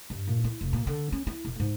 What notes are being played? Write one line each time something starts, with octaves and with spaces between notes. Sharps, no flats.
G2
A#2
E4
F1
A#2
D3
C#4
E4
E1
G#2